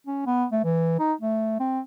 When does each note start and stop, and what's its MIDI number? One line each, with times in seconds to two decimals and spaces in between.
0.07 0.25 61
0.27 0.46 59
0.52 0.60 57
0.64 0.96 52
0.99 1.13 63
1.21 1.55 57
1.60 1.80 60